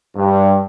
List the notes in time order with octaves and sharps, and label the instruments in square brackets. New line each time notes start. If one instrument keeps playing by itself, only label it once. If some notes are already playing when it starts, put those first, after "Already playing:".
[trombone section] G2